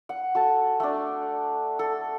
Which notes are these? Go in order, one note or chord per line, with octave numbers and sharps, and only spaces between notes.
F#5
F#4 A4 A5
A3 D4
A4